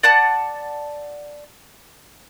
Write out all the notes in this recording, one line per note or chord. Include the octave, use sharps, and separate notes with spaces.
D5 F#5 A5